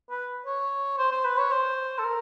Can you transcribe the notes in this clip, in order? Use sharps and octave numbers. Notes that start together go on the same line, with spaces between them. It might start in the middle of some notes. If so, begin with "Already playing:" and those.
B4
C#5
C5
C5
B4
C#5
C5
A4
A#4